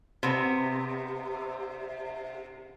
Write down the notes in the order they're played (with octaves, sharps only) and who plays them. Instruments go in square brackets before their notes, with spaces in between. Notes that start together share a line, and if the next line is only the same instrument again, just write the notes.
[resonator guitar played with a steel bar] C3 B3